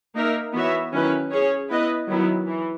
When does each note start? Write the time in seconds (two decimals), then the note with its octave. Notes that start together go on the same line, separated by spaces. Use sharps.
0.15 A#3 D#4 A#4 E5
0.53 E3 B3 F#4 C#5 E5
0.93 D#3 F#3 C#4 E4 B4
1.31 C#4 G#4 C#5
1.70 B3 E4 B4 D#5
2.09 D#3 F#3 B3 E4
2.47 E3